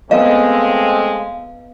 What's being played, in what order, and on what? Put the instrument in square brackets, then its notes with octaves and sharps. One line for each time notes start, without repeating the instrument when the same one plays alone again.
[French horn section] G#3 A3 C4 [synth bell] B3 F5 [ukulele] B4 D#5